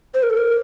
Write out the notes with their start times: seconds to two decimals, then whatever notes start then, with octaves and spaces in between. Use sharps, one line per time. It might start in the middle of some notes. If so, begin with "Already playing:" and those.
0.14 C5
0.23 A#4
0.30 A4
0.37 A#4